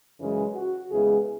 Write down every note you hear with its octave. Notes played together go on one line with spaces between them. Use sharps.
F#2 C#3 E3 G#3
F#4
E2 C#3 E3 G#3 B3 G#4